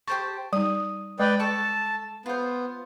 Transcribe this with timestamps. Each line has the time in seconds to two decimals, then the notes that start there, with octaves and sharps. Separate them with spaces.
0.08 G4 C5 A5 C#6
0.53 G3 D#4 D#6
1.19 G#3 B4 D5 G5
1.40 A4 A5 C#6
2.26 B3 F4 C5